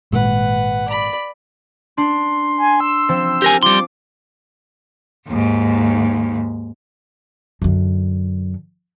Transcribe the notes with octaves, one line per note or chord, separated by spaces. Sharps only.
G#1 A#2 G#3 B4 F#5
D5 B5
D4 C6
G#5
E6
F3 C4
G4 A#4 G#5
G3 F4 C6 D6
D#2 G#2
F#2 D3